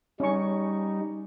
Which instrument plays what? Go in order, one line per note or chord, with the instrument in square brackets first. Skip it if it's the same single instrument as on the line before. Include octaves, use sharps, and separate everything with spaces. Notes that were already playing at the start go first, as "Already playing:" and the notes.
[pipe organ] G3 D#4 [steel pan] C#4 C#6